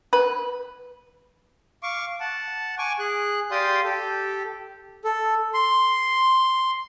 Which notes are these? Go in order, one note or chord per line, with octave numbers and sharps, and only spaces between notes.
B4
F5 C#6 D6
F#5 A5
G#5 C#6 D6
G#4 F#6
G4 D5 F5 G5 C6 D#6
G4 A4
A4
C6